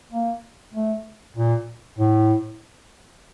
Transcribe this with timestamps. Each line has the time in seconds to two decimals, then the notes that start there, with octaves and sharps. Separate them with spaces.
0.13 A#3
0.74 A3
1.37 A#2
1.98 A2